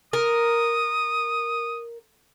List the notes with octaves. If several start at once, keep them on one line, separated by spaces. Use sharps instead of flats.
A#4 D#6